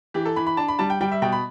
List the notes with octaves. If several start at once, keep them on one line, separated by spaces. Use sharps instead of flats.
E3 G4
A4
E3 B5
B5
D4 A5
B5
G3 A5
G5
G3 G5
E5
B2 G5
B5